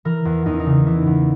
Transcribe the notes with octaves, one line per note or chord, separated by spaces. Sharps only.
E3 A#4
E2
E2 D#4
C#4
D#4
C#3
E3 E4
E2